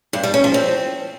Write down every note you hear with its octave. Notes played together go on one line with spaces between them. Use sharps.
G2
G3
C#4
F3
C4